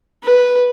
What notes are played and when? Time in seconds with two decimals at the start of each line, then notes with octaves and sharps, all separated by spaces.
0.24 B4